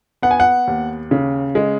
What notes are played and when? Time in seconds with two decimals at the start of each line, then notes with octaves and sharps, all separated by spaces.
0.22 B3 F#5
0.31 G#5
0.40 F#5
0.67 D#2
1.11 C#3
1.55 G#3